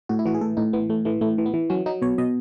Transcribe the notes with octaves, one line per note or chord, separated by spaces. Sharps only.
A2 F#4
E4
E3 F#4
G#4
A2 A4
A2 D#4
E3 B3
A2 A3
E3 A3
A2 A3
E3
B3
E3
F#3 C#4
F#3 D#4
B2 C#5
B2 D#5